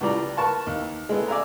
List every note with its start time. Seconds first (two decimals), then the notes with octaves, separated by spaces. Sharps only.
0.01 C#2 A2 G3 D5 A#5
0.37 A#4 B4 A5 C#6
0.67 D#2
1.09 G#3 A3 B3
1.28 D5 E5 G#5 A#5